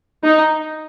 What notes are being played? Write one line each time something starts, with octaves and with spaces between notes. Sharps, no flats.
D#4